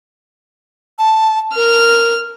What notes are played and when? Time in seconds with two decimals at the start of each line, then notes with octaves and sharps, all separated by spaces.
0.99 A5
1.56 A#4 F6